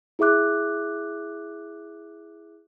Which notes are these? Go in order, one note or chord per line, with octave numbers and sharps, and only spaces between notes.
E4 G#4 E5 D6 F#6